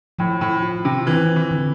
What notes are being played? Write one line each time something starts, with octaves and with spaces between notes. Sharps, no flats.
A2 F3
A2
F4
C3
E3 C4
E3
D3